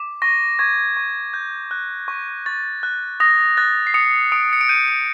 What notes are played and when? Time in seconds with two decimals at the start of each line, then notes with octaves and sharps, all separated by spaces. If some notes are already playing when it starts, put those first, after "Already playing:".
Already playing: D6
0.22 C#6 A#6
0.59 C#6 G#6
0.97 C#6
1.34 G6
1.71 F#6
2.08 C#6
2.46 C#6 A6
2.83 F#6
3.20 D#6 A#6
3.57 F#6 A6
3.87 C7
3.94 D#6 C#7
4.32 D#6 D7
4.53 C#7
4.61 D7
4.69 G6 D#7
4.88 D7